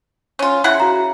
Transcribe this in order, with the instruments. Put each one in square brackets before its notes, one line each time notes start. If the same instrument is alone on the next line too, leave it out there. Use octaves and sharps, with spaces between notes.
[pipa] C#4 F4
C#3 E4 F#5
[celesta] F#4 A#5